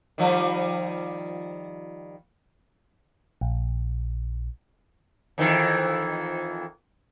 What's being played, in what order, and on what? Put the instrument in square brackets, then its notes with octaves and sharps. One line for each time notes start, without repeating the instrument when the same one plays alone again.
[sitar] D#3 F3 G3
[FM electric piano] A#1
[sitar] F2 D#3 E3